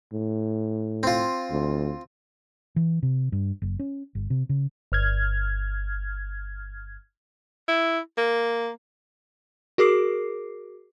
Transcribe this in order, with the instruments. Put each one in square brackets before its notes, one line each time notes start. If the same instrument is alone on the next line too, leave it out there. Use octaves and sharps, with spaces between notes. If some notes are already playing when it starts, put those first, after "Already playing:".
[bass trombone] A2
[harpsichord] C4 F4
[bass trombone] D2
[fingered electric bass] E3
C3
G2
F#1
C#4
G1
C3
C#3
[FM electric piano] G1 F6 G#6
[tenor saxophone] E4
A#3
[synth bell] F#4 G#4 A#4 D6 C7